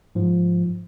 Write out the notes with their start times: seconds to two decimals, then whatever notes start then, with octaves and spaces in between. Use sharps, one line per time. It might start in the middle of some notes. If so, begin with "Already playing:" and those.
0.15 G#2 F3